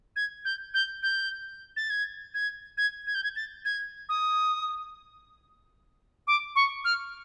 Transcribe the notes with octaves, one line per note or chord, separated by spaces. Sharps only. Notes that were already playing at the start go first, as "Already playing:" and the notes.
G#6
G6
G6
G6
A6
G#6
G#6
G#6
G#6
G6
G#6
A6
G#6
D#6
D6
C#6
F6